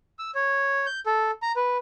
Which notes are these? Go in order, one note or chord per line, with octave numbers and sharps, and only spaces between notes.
E6
C#5
G6
A4
A#5
B4